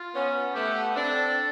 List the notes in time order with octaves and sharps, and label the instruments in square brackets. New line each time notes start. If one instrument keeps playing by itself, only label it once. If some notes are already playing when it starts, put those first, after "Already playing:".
Already playing: [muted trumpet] F4
[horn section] B3 C#4
[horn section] A3 B3 [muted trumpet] G4
[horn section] C4 D4 [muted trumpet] A4